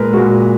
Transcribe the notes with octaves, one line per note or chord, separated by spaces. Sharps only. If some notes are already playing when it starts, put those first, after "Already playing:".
Already playing: A#2 G#3 A#4 B4
A#2 G#3 F#4